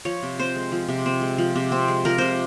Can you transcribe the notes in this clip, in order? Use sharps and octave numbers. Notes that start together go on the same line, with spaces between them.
F3 C#5
C3
C4 C5
G#3
F3
C3
C4
G#3
F3
C3
C4
G#3
F3 A#4
C3 C5